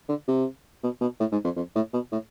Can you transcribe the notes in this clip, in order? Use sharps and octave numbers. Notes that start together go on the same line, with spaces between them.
D3
C3
B2
B2
A2
G#2
F2
F2
A2
B2
A2